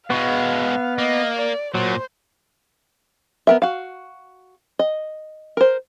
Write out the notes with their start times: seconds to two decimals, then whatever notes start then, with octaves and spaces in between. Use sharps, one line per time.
0.10 B2 G#3 B3 F5 C#6
0.98 A#3 D#5
1.36 D5
1.74 A#2 F#3 C5
3.47 B3 A#4 E5
3.62 F#4 F5
4.79 D#5
5.57 A#4 C5